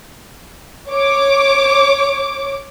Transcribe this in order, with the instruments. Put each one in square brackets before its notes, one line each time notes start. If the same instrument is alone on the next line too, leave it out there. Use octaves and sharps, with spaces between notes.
[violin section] C#5 D6